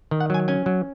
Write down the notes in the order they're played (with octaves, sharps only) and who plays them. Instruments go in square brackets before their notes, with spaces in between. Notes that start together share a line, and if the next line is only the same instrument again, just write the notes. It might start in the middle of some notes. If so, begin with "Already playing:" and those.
[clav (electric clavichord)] D#3
F#5
F#3 G#5
C#4 G#5
F#3